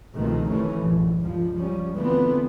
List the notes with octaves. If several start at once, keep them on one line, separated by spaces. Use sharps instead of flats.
C2 B2 D#3 F3 A3 C4
F1 C3 D#3 E3 A3 C#4
A#1 G2
C#2 G2 F3
F3 G3 C#4
D3 E3 F3 A3 B3 C4